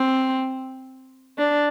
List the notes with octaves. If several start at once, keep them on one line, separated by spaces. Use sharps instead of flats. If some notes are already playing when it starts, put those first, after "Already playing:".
Already playing: C4
D4